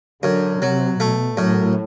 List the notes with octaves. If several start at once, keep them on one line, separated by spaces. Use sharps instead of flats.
F#2 D3
C3 F#3
B2 A3
F#2 A2